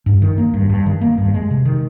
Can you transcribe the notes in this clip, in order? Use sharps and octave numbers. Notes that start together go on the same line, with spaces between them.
G2
D#3
A#3
G2
G2
D#3
A#3
G2
G#3
C3
D#3